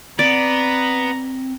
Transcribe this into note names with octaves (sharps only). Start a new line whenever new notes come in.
B3 C4 D5 A#5